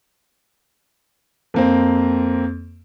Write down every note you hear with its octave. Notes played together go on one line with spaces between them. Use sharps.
F2 A#3 C4